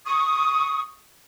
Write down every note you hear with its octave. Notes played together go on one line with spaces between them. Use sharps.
C#6 D#6